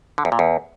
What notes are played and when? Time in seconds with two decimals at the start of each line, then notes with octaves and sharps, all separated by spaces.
0.18 D3
0.25 E2
0.32 A#2
0.39 E2